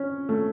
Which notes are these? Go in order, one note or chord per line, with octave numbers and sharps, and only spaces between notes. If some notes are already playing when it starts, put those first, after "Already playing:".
Already playing: C#4
A3